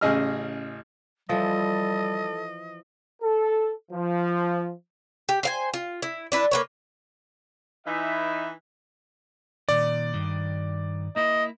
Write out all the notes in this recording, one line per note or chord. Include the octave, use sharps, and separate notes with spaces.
A1 C#3 G#4 D#5 E6 F6
E3 F3 G3 A4 D#5
A4
F3
G4
C5 F5 G#5
F4
E4
D4 E4 B4
A#3 B4 C#5
E3 D#4 E5
A#2 D#3 D5
G2 D#3
A#3 E4 D#5